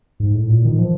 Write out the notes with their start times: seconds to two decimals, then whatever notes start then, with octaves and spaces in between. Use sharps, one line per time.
0.20 G#2
0.34 A2
0.49 A#2
0.65 D#3
0.79 F3